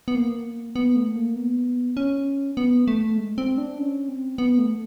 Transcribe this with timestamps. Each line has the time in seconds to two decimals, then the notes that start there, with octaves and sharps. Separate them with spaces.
0.08 B3
0.15 A#3
0.76 B3
0.96 A3
1.16 A#3
1.36 B3
1.97 C#4
2.57 B3
2.88 A3
3.17 G#3
3.38 C4
3.58 D4
3.79 C#4
4.09 C4
4.38 B3
4.59 A3